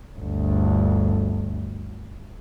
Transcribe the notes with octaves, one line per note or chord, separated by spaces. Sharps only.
G1 D2